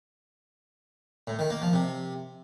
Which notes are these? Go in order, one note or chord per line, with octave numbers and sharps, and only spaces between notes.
A2
D#3
A#3
F3
C3